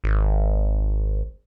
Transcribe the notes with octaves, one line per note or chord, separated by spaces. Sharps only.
G#1